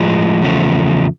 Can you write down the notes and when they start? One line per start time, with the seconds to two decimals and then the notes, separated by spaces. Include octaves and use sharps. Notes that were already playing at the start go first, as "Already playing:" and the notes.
Already playing: A2 F3 G#3
0.42 E2 C#3 F3 A3